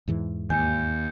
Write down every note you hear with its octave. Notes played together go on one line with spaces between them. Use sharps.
E2 G#2 E3
D#2 G#5 G6 C#7